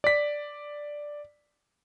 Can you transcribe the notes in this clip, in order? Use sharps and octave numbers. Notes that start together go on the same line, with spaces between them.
D5 B6